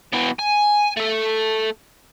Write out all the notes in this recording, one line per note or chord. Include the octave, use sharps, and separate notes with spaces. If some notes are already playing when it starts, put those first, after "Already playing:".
B2 E3
G#5
A3 A4